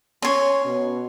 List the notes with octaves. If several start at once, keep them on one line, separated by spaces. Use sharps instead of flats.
C#4 C#5 C6
B2